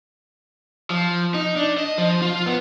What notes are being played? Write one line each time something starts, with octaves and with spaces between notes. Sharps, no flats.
F3
D#4
D4
D#5
F3
F4
B3